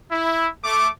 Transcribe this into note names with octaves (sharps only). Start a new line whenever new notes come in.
E4
A3 D6